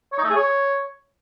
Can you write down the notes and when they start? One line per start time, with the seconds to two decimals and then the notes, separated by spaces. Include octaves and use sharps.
0.12 C#5
0.18 D#4
0.24 A3
0.30 G#4
0.36 C#5